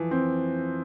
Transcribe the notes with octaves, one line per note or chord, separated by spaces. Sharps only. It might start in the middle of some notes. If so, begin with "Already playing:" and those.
Already playing: E3 F3
C4